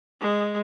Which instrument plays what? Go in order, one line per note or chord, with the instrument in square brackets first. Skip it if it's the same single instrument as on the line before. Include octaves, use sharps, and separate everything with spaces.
[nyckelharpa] G#3